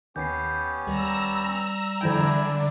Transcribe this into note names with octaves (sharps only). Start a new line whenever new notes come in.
D#2 B3 C#4 G4 G6 C7
D#2 G3 A#5 E6
F2 D3 E3 D4 E4 E5 G5 G#5